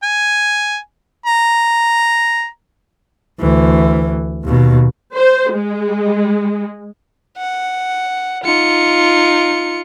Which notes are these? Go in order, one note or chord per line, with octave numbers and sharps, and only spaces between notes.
G#5
A#5
D2 E3
D#2 B2
C5
G#3
F#5
D#4 F4 C#7